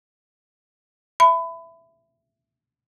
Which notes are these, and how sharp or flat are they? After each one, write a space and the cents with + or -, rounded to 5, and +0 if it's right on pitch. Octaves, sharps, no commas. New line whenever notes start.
E5 +10 B5 +25